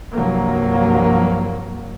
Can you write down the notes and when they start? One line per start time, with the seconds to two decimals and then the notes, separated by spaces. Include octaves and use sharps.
0.15 C2 G2 F3 F#3 A#3